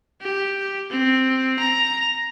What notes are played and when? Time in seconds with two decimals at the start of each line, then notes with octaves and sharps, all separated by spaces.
0.22 G4
0.91 C4
1.59 A#5